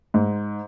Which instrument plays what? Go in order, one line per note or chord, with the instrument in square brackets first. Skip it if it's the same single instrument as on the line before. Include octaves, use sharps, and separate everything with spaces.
[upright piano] G#2